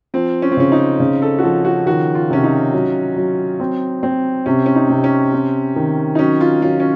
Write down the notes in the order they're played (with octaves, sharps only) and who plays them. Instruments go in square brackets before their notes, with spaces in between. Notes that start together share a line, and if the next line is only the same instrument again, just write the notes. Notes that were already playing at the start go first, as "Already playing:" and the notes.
[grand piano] F3 [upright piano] C4
[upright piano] C#4
C4
[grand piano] C#3 [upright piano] C#4
[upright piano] D#4
[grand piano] C#3
[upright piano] A4
F#4
[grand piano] F3 [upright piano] A4
[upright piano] F#4
[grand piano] D#3 [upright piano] F#4
[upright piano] F4
[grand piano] C3 [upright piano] C#4
[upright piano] D#4
[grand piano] F#3
F#3
C4
C4
[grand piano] C3 [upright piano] C#4
[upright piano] C#4
D#4
[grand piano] C3
[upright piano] C#4
[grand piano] C4
D#3
[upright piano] D#4
[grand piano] F#3 [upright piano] C#4
[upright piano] F4
[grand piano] F#3 [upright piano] F4
[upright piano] C#4